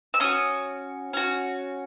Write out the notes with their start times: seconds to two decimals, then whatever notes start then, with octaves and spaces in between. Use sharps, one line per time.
0.14 E6
0.20 C#4 F#4 D#6
1.13 C#4 F#4